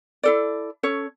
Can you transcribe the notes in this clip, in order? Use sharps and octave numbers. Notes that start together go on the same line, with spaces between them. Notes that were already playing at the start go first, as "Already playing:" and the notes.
E4 A4 D5
C#4 A4 C#5